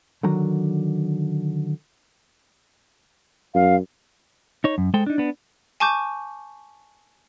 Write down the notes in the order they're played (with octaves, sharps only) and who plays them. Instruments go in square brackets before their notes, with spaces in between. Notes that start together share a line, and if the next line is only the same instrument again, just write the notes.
[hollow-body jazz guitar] D3 D#3 F#3 A#5
[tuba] F#2 [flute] F5
[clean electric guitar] D#4 C#5
F#2
G#3 A4 C5 G5
D4 D#4
B3 D4
[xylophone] G#5 A5 C#6 D6 G6